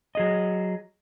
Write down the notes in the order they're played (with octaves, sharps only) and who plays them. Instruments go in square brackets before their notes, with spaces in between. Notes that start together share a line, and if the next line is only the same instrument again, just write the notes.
[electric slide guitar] F#3 G#4 D#5